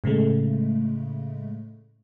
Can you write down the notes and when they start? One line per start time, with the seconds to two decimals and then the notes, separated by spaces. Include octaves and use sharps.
0.04 A2 C#3 G#3 A3